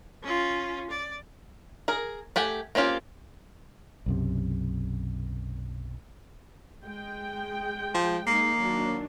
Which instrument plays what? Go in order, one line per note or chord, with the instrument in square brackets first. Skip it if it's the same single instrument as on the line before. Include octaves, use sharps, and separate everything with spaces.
[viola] C#4 F4
D5
[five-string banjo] G#4 A#4
A3 G4 F#5 G#5
A#3 C4 C#4 F4 G4
[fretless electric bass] B1 F#2 C3
[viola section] G#3 G5
[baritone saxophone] F3
[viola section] G#3 D#4 [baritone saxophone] A#3 [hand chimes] C7
[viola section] D#3 F#3 D4